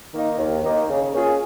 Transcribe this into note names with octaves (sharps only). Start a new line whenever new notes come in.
D#3 A#3 D#4
D#2
D#3 A#3 D#4
C#3
A#3 C#4 F4 G#4